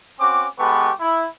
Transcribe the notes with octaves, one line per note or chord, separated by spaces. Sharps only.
C4 C#4 F#4 D6
G#3 B3 G4 A4 B4 C#6
E4